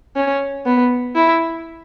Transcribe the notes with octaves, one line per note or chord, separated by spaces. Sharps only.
C#4
B3
E4